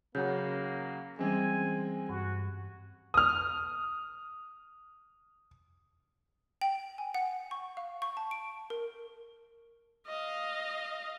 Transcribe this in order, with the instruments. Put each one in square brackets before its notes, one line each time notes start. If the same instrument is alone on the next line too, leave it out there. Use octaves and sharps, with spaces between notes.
[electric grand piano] C#3 F#3 F#5 [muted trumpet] A#3 [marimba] G6
[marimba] E3 G3 C#4 [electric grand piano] G#3 C4 [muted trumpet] G#5
[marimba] G2 [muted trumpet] F#4
[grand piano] D#6 F6
[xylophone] G5
G#5
F#5
C#6
F5
C#6
A5
D7
A#4
[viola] D#5 F5